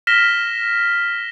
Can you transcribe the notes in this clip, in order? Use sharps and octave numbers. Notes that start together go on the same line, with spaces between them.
F6 A#6 B6 E7 G7